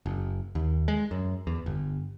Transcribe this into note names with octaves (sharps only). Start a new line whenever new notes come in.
F#1
D#2
G#3
F#2
E2
G1